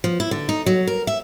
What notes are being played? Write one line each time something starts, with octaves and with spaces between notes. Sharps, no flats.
F3
E4
D3
D#4
F#3
A#4
E5